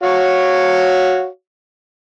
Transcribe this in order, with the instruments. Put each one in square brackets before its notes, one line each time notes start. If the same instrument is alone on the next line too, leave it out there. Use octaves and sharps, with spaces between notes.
[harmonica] F#4 C#5 F5